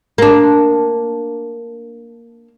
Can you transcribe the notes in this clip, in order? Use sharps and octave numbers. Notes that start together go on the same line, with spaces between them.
A#3 D4